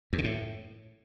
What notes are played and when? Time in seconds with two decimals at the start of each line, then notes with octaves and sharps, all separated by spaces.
0.13 E2
0.18 C#3
0.24 A2